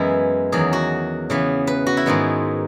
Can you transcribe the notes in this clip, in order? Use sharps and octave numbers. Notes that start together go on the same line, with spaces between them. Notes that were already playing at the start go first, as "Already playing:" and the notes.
Already playing: F#2 E3 G#3 B3 E4
E2 D#3 F#3 G#4
F#4
C#3 E3 B3
B4
F#4
E4
G#2 D#3 G#3 B3